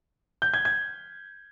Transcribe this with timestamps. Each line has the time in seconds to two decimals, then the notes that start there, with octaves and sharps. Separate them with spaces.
0.42 G6
0.54 G#6
0.65 G#6